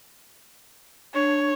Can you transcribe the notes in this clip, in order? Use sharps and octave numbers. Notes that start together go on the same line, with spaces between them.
D4 C#5